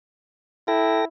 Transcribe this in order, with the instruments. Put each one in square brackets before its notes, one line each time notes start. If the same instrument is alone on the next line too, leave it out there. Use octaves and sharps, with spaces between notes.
[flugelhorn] E4 [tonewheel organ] A4 G5 A#6